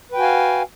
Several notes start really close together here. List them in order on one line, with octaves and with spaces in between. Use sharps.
B4 G5 F#4 G#5 F5